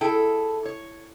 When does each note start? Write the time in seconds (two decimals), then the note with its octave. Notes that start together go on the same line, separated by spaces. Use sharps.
0.01 E4 G#4 A4 G5
0.66 C#5